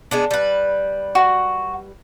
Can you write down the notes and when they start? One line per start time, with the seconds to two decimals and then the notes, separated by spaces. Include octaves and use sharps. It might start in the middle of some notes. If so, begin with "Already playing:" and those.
0.11 G#3 B3 D4
0.31 G3 B4
1.15 F#4